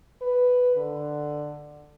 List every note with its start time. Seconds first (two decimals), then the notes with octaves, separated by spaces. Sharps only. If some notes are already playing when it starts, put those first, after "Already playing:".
0.22 B4
0.76 D3